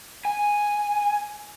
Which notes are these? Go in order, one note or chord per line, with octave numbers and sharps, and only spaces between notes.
G#5